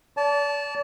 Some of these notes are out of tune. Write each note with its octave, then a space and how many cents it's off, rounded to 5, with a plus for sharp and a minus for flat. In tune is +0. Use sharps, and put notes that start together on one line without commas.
D5 -40 A5 -15